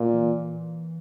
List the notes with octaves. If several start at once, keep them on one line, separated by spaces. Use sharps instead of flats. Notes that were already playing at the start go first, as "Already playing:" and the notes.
Already playing: A#2
E3